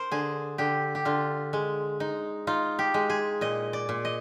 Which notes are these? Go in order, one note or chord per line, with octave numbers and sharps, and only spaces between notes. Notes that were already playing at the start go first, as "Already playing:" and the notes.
Already playing: A#4 C5
D3 G#4
D3 G4
G4
D3 F4
G#3
D#4
D#4 F4
G4
G#3
G#4
A#2 D#5
D5
A#2
D#5